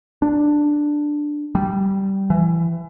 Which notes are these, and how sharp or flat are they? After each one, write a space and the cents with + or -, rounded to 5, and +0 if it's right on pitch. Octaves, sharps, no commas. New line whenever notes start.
D4 +5
G3 -15
E3 +25